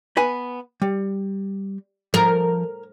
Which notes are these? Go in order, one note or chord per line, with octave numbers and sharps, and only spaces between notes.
B3 B4 G#5
G3
F3 A#4